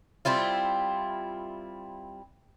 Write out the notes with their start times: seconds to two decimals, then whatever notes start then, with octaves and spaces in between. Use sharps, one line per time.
0.25 G3 C4 E4 F4